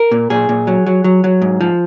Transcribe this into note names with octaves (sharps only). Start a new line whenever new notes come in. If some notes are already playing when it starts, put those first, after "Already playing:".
Already playing: A#4
A#2
A#2 G#4
A#2
F#3
F#3
F#3
F#3
G#2
F3